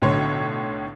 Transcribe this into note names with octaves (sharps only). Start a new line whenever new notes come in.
B1 A2 D3 C#5 C6